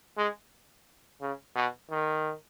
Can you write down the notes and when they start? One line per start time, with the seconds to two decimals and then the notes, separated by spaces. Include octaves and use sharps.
0.17 G#3
1.21 C#3
1.56 B2
1.90 D#3